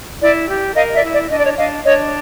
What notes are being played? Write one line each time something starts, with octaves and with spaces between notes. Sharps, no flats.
E4 D5
G4
A#4 D#5 F5
D5 E5
E4
D5
D4 D#5
D5
C#5 D#5
D4 D#5 F5
D4 C#5 D#5